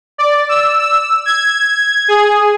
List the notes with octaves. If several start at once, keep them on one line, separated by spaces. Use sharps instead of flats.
D5
E6
E6
G#6
G#4